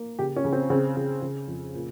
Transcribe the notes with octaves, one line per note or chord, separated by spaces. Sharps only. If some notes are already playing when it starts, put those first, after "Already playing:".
Already playing: A#3
C#3 G4
C#4
C#3
C4
C#3 C4
C#3
C#3
F2
A#2